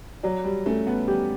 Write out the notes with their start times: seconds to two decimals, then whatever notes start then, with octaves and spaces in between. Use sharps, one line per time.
0.23 F#3 D5
0.44 G3
0.66 A3 C#4
0.87 B3
1.07 G3 G4